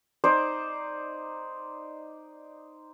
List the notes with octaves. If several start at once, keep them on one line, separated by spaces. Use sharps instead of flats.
D#4 C5 D5